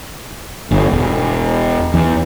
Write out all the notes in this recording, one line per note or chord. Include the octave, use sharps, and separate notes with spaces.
G1
E1
E2